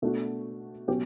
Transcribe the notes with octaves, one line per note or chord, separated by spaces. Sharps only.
B2 A3 D4 F#4
B2 F#3 C#4 G4